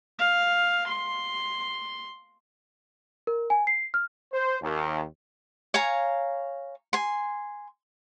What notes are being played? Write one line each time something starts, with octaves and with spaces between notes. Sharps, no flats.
F5
C6
A#4
G#5
C7
F6
C5
D#2
C#5 F5 G#5 A#5
G#5 C6